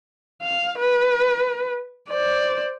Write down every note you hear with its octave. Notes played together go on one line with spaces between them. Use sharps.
F5
B4
C5 D5